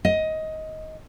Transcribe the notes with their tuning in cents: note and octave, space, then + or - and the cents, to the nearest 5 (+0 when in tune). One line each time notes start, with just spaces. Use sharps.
D#5 +15